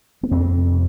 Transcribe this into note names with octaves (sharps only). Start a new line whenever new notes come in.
B3
F2 C4
C3